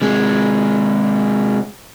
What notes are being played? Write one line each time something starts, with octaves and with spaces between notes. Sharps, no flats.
C3 G#3